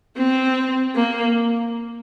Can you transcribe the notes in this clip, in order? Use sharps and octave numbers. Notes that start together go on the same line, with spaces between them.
C4
A#3